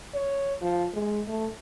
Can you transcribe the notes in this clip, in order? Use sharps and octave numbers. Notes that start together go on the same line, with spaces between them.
C#5
F3
G#3
A3